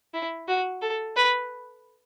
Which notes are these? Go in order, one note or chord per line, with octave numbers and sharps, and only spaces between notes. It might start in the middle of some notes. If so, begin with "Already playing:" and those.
E4
F#4
A4
B4